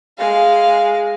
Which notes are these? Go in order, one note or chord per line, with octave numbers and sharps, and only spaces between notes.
G#3 F5